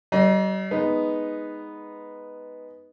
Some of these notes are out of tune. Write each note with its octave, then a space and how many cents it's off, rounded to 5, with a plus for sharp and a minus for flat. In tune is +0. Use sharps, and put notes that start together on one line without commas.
G3 -45 D#5 +0
G#3 +0 B3 +0 D#4 +0